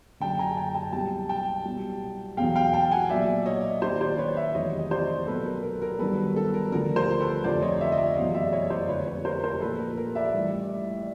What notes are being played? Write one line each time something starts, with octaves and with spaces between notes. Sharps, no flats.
F#1 F#2 D3 G5 A5
G#5 A#5
G5 A5
G5 A5
C2 B2 F#3 G5 A5
G5 A5
C2 B2 F#3
E1 E2 B2 F#3 F5 G5
F5 G5
G5 A5
F#5 G#5
B1 A#2 F#3 D5 E5
C#5 D#5
D#2 D#3 F#3 C5 D5
C5 D5
B4 C#5
D5 E5
F1 E2 C3 D#3 F#3 C#5 D#5
D#5
C5 D5
B1 B2 F#3 A4 B4
A#4
A#4
A#4
G1 G2 D#3 F#3 A4 B4
A#4
A4
A#4
D2 D3 F3 A#4
A#4 C5
A4 B4
F1 F2 D3 F3 C5 D5
C#5 D#5
D5 E5
D#5
D5 E5
F#1 E2 B2 F#3 D#5 F5
D5 E5
C#5 D#5
C5 D5
F1 F2 D3 B4 C#5
B4 C#5
A#4 C5
A#4 C5
A#1 A#2 F3 A4 B4
A#4
A#4
D5 E5
A1 G2 E3